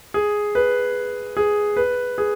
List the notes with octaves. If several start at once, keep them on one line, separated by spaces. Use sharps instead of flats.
G#4
B4
G#4
B4
G#4